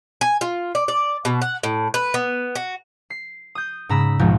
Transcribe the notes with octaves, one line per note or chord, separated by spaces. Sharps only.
G#5
F4
D5
D5
B2
F#5
A2
B4
B3
F#4
C7
D#6 G6
G#2 C#3 A#5 B5 E6
A#1 D#2 G#2 B2 F3 G#3